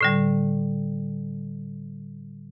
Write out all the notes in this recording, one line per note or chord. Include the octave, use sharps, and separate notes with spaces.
A2 D3 G3